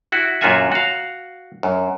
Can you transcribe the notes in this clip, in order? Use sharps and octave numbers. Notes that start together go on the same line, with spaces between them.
E4 F#4
F#2 A#2 F4 F#4 E5 G#5
F#4 F5
F#2